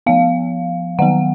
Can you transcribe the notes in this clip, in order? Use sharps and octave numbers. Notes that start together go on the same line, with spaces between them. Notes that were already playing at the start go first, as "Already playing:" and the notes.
F3 B3 F5
D#3 F#3 B3 F#5